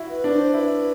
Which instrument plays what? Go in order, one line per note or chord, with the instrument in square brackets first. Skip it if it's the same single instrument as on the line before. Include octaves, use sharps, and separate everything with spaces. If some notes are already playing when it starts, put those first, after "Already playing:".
Already playing: [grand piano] E4 F#4
[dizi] B4
[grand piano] D4
[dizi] C5
[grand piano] E4 [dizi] B4